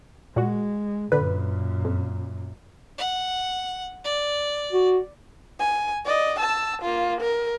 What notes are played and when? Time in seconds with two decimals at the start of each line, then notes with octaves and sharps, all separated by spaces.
0.36 A#2 G#3 F#4
1.12 F#2 A#2 D3 B4
1.85 F2
2.98 F#5
4.04 D5
4.73 F#4
5.60 G#5
6.05 D5 D#5
6.40 A5 E6
6.82 A#3 F4
7.21 A#4